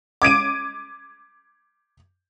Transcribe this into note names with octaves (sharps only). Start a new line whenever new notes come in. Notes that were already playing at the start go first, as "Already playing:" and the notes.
D6 G#6 D7 D#7